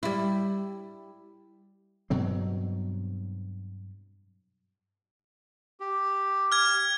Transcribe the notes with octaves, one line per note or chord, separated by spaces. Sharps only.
G3 E4
G2 B2 F#3 C4
G4
F6 G#6